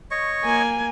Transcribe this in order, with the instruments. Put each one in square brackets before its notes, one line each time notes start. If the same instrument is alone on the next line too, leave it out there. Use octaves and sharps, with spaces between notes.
[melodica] C#5 D#5 C#6
[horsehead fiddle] A#3 G#5